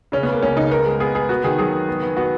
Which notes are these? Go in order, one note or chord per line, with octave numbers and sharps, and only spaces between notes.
C#3 C#4
B3
C#3 A#3
C#2 C#4
C#3 D#4
B3 A#4
G#3
B3 G#4
B3 G#4
B3 F#4
D#3 G#4
F#3 G#4
B3
B3
B3
B3 F#4